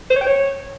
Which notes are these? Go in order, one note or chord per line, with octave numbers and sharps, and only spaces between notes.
C5
C#5
G5
C#5